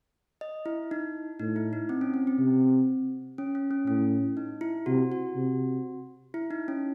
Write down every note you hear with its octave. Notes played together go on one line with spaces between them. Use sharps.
D#5
E4
D#4
A2 D#4
E4
D#4
C4
C#4
C4
C4
C3
C#4
C#4
C#4
A2 C#4
D#4
E4
C3 F#4
F#4
C3
E4
D#4
C#4